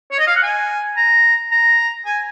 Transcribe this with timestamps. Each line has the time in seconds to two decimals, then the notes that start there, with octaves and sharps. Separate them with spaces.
0.12 C#5
0.19 D#5
0.27 F5
0.36 F#5
0.43 G#5
0.97 A#5
1.52 A#5
2.06 G#5